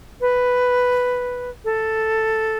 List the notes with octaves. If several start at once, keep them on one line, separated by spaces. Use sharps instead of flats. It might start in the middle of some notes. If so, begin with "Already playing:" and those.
B4
A4